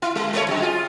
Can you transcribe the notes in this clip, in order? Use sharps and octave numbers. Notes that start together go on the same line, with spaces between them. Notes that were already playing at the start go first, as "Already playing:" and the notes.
E4
G3
G3 C#5
F#2 E3 G#3
F4 G#4